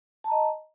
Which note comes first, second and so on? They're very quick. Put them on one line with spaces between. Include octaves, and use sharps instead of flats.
A5 A#5 D#5